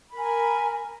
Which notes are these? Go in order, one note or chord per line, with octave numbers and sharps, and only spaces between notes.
A#4 G#5 B5